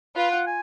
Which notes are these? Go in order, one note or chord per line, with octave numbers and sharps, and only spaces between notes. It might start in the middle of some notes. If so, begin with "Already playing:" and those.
F4 B4
F#5
G#5